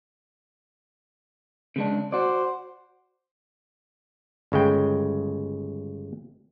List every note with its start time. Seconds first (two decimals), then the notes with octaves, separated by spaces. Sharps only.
1.76 C#3 G#3 D4
2.12 F#4 C5 D5
4.52 G1 C#3 G#3 G5